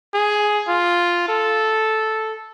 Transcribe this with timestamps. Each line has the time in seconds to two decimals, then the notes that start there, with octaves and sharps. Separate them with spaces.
0.14 G#4
0.68 F4
1.29 A4